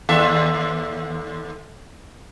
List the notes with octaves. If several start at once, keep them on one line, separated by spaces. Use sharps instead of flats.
D#2 A4 E5